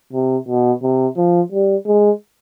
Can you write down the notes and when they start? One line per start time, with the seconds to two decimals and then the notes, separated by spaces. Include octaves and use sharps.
0.13 C3
0.48 B2
0.83 C3
1.17 F3
1.52 G3
1.87 G#3